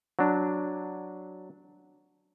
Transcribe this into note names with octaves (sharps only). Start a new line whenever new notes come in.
F#3 D4